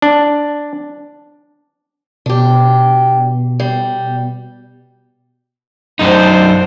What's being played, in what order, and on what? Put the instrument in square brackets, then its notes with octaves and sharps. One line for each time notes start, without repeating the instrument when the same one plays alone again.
[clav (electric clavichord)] D4
[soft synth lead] B2 [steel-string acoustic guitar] D4 G4
[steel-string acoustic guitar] G3
[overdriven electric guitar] F#2 D#4 [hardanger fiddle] D4 C5